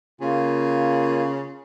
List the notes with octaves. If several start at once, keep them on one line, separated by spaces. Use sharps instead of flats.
C#3 A#3 F4 G#5